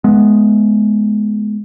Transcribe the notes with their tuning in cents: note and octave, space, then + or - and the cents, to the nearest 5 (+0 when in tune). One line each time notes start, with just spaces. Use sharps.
G#3 +25 B3 +0